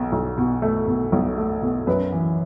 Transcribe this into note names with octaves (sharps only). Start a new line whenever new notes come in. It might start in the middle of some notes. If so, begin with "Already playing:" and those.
Already playing: B1 B2
B1
B2
A3
B2
B1
A3
B2
F#2 B4
E3